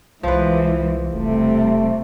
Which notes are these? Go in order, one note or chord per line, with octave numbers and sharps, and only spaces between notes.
C2 E3 F3 G#3 B4
E1 C3 G3 A3